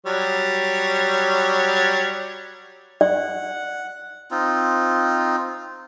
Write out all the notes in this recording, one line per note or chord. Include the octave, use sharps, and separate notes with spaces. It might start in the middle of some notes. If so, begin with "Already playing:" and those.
F#3 G3 C#5
D5 F#5
C4 D#4 F4